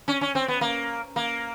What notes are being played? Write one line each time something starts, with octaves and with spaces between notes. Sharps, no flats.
C#4
C#4
C4
B3
A#3
A#3